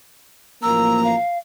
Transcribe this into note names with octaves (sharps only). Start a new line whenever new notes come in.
A1 F3 A#3 A#5 E6
F5